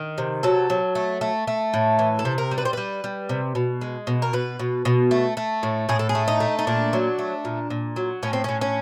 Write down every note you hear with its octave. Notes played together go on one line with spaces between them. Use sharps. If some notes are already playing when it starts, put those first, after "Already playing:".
Already playing: D#3
C3
F#3 A4
F#3
A3
A3
A3
A2
E3
A4
C3
A#4
G3
B4
C5
G3 B4
G3
C3
B2
G#3
B2
A#4
B2 B4
B2
B2
A3
A3
A2
A2 G#4
A4
G#4
A3
D#4
A3
D#4
A#2 D4
F#3
A3
A#2
A#2
F#3
A2 C#4
C4
A2 C#4
C#4